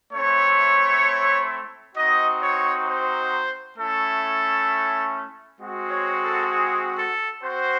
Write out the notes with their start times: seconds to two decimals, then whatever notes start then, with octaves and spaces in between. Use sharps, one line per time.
0.13 A3 C4 E4 C#5
1.96 C4 D#4 F#4 D#5
2.41 C#5
2.87 C5
3.78 A3 C#4 E4 A4
5.60 G#3 C4 F#4
5.91 C#5
6.21 A4
6.52 G#4
6.97 A4
7.42 C4 F#4 C5